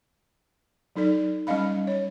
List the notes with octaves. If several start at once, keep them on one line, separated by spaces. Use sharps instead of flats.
F#3 D#4 A4 D5
G3 C#4 D#5 F5 B5
C#5